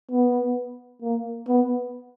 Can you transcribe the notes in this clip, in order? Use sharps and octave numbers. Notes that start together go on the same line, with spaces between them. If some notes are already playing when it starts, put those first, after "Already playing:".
B3
A#3
B3